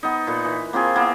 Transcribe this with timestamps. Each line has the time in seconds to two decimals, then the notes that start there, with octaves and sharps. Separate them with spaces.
0.03 B3 D#4
0.27 A#2 B4
0.45 E3
0.73 A#3 C4 F4 G#4
0.95 A#3 B3 E4